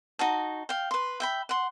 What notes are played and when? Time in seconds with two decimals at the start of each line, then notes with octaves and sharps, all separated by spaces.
0.19 D#4 F#4 A5
0.69 F5 G5
0.91 B4 C6
1.20 E5 G5 B5
1.49 F#5 C6